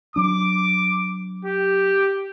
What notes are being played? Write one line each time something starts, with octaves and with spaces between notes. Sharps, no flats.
F#3 D4 D6
G4